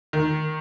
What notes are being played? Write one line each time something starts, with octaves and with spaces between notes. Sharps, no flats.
D#3